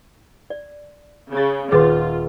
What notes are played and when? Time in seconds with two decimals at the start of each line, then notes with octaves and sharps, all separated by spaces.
0.50 D5
1.32 C#3 G#6 A6
1.72 D#1 F4 G#4 B4 C6 A6